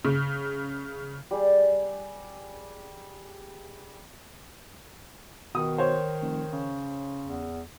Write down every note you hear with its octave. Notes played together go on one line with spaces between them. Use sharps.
C#3
G3 G#4
B2 D#3 D#6
C5 C#5
F1
C#3
E2